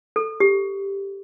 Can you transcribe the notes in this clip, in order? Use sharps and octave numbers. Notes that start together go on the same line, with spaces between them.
A4
G4